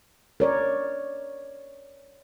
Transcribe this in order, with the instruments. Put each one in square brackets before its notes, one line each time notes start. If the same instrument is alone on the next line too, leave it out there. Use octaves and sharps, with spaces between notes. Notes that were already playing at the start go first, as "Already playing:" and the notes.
[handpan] A#4 C#5 D5